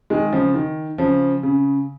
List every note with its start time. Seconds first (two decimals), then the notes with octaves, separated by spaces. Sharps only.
0.10 D#3 G#3
0.32 C#3 F3
0.54 D#3
0.98 C#3 F3
1.43 C#3